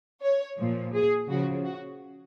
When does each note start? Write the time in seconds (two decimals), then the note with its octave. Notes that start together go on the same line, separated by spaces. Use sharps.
0.23 C#5
0.59 A#2 F3
0.94 G#4
1.30 C#3 F3 F#4
1.66 F#4